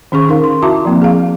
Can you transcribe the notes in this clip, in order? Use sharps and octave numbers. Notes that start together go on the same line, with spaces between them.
D#3 C#4 G#4 C#6
D#4 A#4 F5
C6
E4 F#4 E5 A5 A#5 D6
F3 A#3 C4
G#4 F5